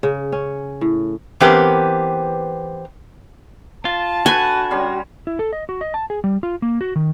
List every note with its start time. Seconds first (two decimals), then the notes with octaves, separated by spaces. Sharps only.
0.03 C#3
0.32 C#4
0.81 A2
1.40 E3 B3 C4 G4 A#4 B4
3.85 F4 A5
4.26 D3 F#4 B4 G#5
4.71 G3 C#4 C6
5.27 E4
5.39 A4
5.53 D#5
5.69 F#4
5.81 D#5
5.94 A5
6.10 G#4
6.24 G3
6.43 F4
6.62 A#3
6.81 F#4
6.96 D#3